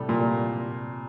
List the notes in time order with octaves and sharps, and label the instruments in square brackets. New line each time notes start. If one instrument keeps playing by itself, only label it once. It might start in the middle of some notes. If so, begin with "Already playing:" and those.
Already playing: [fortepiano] A2 [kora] C3 G3 A4
[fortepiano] A#2